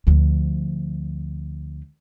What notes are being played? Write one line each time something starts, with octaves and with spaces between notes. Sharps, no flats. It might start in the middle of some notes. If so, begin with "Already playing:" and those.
D2 F3